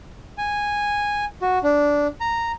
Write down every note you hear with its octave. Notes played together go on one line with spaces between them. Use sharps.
G#5
F#4
D4
A#5